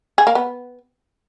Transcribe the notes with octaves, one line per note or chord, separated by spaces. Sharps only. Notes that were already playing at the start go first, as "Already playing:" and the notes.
G#4
A#3
B3